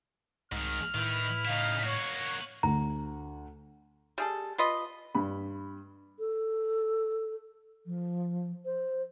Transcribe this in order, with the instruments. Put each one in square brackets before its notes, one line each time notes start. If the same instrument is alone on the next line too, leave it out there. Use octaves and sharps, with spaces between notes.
[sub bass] C2 [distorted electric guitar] G#2 D#3 [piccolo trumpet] F6
[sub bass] A2 [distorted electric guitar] D#3 [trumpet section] E4 B4
[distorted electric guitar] C#3 E4 [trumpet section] D#4 F5
[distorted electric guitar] A#3 F#4 [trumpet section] C#5
[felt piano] D2 [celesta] A#5
[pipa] G3 G#4 A4
F4 B4 D#5
[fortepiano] G2 B5
[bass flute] A4
F3
C5